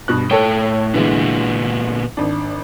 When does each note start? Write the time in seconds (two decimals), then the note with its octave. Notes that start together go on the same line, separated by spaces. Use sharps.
0.08 G2 B2 F#6
0.31 A2 A4 C#5 G5
0.94 A#2 D3 E3 G#3 B3
2.17 G#1 D4